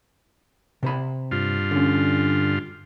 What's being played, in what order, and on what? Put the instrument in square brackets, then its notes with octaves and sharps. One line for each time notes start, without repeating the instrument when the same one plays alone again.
[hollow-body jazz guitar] C3 C5 B5
[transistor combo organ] G2 F4
[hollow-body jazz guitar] D3 C#4